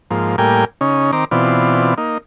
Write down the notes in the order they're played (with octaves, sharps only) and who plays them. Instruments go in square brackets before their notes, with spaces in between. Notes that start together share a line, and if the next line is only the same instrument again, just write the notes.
[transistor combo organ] G#2 F3 A#3
A2 G3 A#3 A#4 G5 G#5
C#3 C#4 D#4
D#3 C4 A#5 D6
B2 E3 C4 F4 D5
A#3 D#4